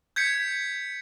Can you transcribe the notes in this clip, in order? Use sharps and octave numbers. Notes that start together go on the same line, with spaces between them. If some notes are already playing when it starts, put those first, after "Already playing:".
G6 G#6 B6 C#7